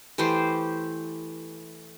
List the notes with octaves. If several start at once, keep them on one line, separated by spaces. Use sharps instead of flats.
E3 A3 G4 C5